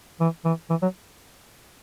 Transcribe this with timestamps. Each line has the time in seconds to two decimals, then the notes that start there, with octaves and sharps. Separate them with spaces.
0.20 E3
0.45 E3
0.70 E3
0.82 F#3